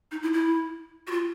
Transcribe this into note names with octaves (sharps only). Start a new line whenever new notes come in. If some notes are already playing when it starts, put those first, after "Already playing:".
D#4
E4
E4
F#4
F4